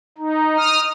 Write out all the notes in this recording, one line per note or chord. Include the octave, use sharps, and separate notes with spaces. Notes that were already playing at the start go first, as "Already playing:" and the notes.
D#4
D#6 F6